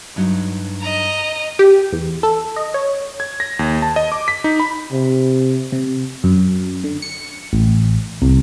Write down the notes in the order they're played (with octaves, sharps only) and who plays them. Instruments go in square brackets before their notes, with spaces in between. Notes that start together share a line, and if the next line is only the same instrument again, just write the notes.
[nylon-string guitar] G2 F#3 D#4
[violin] D#5 A#5
[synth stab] G4
E2
A4
D#5
C#5
[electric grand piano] G#6
A#6
D#2
A5
D#5
D6
B6
D#4
B5
[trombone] C3
[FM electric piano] C3
F#2
D3
C#7
A1
C2